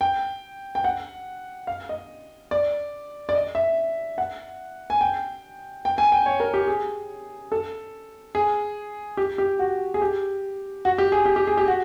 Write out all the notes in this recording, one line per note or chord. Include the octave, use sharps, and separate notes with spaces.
G5
G5
F#5
F5
D#5
D5
D5
D#5
E5
F#5
G#5
G5
G5
G#5
G5
C#5
A#4
G4
G#4
A4
G#4
G4
G4
F#4
G#4
G4
F#4
G4
G#4
G4
G4
G#4
G4
F#4